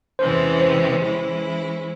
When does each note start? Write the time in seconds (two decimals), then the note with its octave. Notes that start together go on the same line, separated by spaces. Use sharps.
0.19 E2 C3 E3 G#3 C#4 C5
0.61 C5
1.03 E3 G#3 C#4 E4